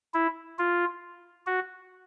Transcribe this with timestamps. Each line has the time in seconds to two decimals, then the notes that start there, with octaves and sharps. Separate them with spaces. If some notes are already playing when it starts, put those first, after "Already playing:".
0.14 E4
0.59 F4
1.47 F#4